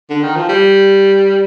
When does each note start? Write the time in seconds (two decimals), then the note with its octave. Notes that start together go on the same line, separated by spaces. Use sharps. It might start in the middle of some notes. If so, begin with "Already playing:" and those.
0.10 D3
0.23 D#3
0.36 F3
0.49 G3